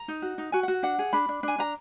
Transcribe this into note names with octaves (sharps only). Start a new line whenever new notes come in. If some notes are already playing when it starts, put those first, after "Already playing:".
Already playing: A#5
D#4
F#4
D#4
F#4 G#5
F#5
F#4
D4 F#5
G#4
D4 B5
D4
D4 G#5
D4 A#5